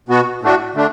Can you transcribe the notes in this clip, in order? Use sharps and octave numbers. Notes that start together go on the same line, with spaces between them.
B2 B3 F#4
A2 A3 D4 F#4
D3 A3 D4